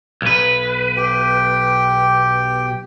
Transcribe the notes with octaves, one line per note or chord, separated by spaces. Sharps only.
B1 B4
G4 G5